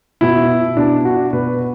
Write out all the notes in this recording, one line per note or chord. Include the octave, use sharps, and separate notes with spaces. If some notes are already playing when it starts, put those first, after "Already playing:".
B2 E4
B2 D4
F#4
B2 B4